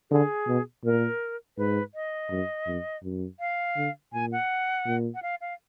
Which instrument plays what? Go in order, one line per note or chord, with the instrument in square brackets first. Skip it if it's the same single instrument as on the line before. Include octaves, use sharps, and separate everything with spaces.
[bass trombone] D3 [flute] G#4
[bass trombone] B2
[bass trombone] A#2 [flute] A#4
[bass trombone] G#2 [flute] B4
[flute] D#5
[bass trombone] F#2
F2
F#2
[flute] F5
[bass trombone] D3
[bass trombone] A#2 [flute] G#5
[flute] F#5
[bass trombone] A#2
[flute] F#5
F5
F5